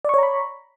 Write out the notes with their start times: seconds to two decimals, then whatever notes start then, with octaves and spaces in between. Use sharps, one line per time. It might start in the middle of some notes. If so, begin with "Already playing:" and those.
0.05 D5
0.09 C#6
0.14 C#5
0.18 A#5
0.23 B5